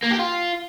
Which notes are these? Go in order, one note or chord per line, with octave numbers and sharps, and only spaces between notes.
A#3
G4
F4